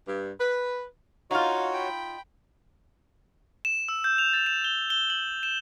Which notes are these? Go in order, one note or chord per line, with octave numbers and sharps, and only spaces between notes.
G2
B4
D#4 F4 F#4 C#5 F5
G5 B5
E7
E6
G6
F7
A6
E7
G7
G7
F#7
E7